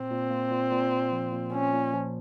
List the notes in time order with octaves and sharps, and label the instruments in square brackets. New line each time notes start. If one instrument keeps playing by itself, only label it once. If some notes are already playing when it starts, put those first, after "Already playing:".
Already playing: [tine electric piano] A#2 [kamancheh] C4
[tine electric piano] A#2
A#3
A#2
A#2
A#2
F3
A#2
[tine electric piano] A#2 [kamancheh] C#4
[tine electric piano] A#2
F3